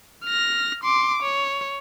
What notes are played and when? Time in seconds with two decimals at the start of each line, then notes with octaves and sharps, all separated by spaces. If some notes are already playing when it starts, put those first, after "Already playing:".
0.25 F6 A#6
0.84 C6 D6
1.23 C#5